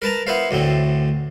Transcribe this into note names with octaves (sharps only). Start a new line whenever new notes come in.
A#4 B4 A5 A#5
B3 E4 B4 C5 F5
D2 A2 D3 C4